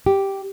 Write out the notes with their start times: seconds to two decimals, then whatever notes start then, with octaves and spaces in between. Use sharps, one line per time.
0.06 G4